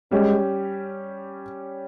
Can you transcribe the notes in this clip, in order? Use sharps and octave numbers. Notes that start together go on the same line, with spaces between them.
G3 G#3 C#4 G4